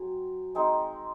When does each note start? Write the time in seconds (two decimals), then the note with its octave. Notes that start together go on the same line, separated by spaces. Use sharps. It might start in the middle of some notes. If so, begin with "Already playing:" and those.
Already playing: F#3 C4 G#5
0.55 G#3 C4 D#4